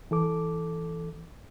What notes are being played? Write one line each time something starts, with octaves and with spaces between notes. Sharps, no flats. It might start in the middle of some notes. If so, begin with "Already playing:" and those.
E3 A4 D6